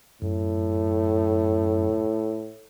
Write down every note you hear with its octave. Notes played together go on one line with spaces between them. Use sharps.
F#2 A2